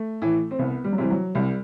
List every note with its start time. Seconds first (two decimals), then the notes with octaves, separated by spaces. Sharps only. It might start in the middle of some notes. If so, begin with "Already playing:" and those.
Already playing: A3
0.22 A2 E3
0.51 C4
0.59 C2 B3
0.84 G3
0.92 F#3
0.98 C3 E3 G3
1.10 F#3
1.35 C2 G3